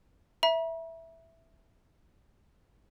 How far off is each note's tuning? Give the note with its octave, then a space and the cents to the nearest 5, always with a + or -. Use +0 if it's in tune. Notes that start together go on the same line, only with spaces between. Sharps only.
E5 +0 A#5 +45